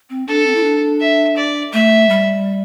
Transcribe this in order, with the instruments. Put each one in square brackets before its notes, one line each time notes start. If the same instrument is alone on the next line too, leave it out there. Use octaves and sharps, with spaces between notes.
[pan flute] C4
[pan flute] D4 [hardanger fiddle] A4
[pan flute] C4
E4
D4
[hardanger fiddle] E5
D5
[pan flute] A3 [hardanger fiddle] E5
[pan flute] G3